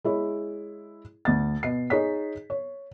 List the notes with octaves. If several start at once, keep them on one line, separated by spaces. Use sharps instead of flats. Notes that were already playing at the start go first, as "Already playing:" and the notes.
G#3 E4 C#5
D2 A6
B2 C7
D#4 G#4 C#5 B6
C#5